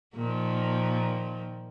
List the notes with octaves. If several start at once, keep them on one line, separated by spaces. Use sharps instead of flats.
A#2 D#3 F3